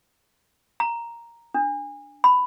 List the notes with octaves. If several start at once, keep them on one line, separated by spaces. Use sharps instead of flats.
A#5
D4
B5